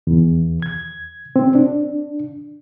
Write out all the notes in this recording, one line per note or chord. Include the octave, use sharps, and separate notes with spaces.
E2
G#6
C4
D4